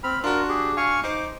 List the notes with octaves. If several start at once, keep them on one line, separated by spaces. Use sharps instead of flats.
C4 B5 F6
D4 F4 F#4 A#4
G4 G#4
F5 G#5 C#6
D#4 C5 D6